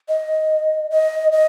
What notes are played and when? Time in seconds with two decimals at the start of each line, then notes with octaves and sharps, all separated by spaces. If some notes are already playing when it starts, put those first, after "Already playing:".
0.09 D#5
0.91 D#5
1.32 D#5